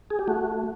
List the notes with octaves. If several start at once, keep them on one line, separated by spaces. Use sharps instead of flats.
G#4
G4
A3 F#4